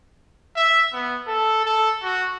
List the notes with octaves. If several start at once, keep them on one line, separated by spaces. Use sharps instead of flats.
E5
B3
A4
A4
F#4